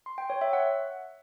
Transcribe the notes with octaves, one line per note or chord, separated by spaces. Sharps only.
C6
G5
C#5
E5
F#5